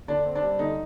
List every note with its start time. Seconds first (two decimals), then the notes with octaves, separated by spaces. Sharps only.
0.08 D3 D4
0.26 C4
0.35 D4
0.42 G3
0.59 D3 D#4